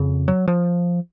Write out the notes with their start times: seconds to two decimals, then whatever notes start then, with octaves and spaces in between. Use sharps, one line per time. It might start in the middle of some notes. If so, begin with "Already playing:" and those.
Already playing: F2 C#3
0.28 F#3
0.48 F3